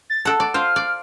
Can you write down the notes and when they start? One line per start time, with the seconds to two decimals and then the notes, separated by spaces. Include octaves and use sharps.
0.10 A6
0.25 A4 F#5 A5
0.40 D5
0.54 F4 C5 F6
0.76 D5